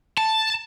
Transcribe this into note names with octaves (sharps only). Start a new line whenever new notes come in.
A5